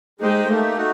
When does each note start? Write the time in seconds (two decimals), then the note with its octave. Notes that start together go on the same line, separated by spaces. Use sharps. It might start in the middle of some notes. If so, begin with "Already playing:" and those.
0.20 G#3 D#4 G4 C5 D#5 G5
0.49 A3 A#3 D#4 G4
0.77 D#4 F#4